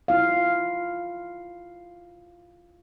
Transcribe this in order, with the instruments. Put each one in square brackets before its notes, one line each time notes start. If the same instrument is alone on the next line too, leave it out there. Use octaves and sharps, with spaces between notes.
[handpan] E4 F4 F5